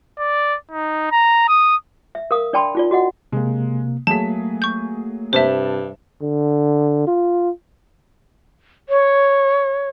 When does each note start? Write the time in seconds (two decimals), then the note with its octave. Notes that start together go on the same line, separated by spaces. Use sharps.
0.18 D5
0.71 D#4
1.11 A#5
1.48 D#6
2.15 E5
2.31 A#4 F5 D#6
2.53 D4 D5 G5 A5 B5 C6
2.75 D#4 F4 D5
2.91 F#4 D#5 F#5
3.32 C3 G#3 A#3
4.07 F#3 A3 A#3 G#4 A5 B6
4.62 C#6 G6
5.33 G2 C3 C5 E5 A5 E7
6.22 D3
7.07 F4
8.89 C#5